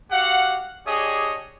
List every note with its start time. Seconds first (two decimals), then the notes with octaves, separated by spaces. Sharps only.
0.11 F#4 G4 F5 F#5
0.86 D4 G4 G#4 C#5 D#5 D#6